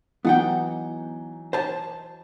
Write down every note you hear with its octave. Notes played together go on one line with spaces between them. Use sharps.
E3 F#3 B3 D#4 F#5 G5
C5 A5